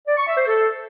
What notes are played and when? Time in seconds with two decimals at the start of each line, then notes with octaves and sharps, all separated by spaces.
0.07 D5
0.17 C#6
0.27 E5
0.37 C5
0.47 A4